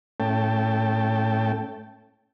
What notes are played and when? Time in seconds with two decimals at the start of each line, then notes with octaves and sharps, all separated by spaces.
0.20 A2 A3 C#4 G5 A5